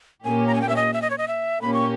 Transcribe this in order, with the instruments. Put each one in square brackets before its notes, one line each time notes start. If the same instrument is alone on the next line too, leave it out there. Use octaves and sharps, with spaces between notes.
[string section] A#2 A#3 C#4 G4 [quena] G#5
[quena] A#5
G#5
G5
E5
D#5
E5
D#5
C#5
D#5
E5
[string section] A#2 A#3 C#4 G4 [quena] B5
[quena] C#6